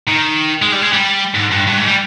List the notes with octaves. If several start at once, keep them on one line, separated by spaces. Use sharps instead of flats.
D#3
G#3
G3
G#3
G3
G#2
G2
G2
G#2
G3